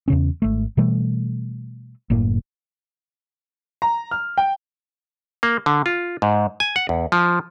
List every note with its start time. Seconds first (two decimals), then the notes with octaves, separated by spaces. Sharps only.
0.08 E2 C#3 C#4
0.42 G#1 A3
0.77 B2 E3 G3 A3
2.10 F#1 A2 A#3
3.82 A#5
4.11 F6
4.38 G5
5.43 A#3
5.66 D3
5.86 F4
6.22 G#2
6.60 G#5
6.76 F#5
6.89 E2
7.12 F3